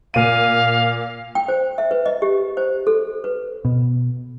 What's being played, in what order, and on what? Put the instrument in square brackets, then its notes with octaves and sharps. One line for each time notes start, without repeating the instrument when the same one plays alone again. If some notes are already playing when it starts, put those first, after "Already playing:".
[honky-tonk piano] A#2 D#7 [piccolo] F5
[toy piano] G5
C5
E5
B4
D#5
G4
C5
A4
B4
[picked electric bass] B2